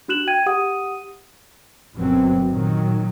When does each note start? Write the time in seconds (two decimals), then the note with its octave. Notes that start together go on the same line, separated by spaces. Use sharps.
0.08 D4 F#4 F#6 E7 F#7
0.27 G5 G#6 D#7
0.46 G4 F#5 D#6 D#7
1.95 G1 F#2 B2 F#3 C4
2.50 A#2 D#3 F#3